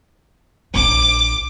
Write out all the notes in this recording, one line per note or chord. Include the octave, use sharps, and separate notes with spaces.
A#1 D4 D6